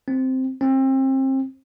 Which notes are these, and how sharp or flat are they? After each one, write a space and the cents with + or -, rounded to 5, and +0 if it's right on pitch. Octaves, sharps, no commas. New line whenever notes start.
C4 -5
C4 +30